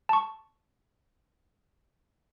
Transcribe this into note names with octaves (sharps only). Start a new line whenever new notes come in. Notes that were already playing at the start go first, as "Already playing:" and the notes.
A5 C#6